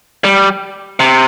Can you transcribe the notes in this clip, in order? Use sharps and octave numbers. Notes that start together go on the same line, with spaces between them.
G3
C3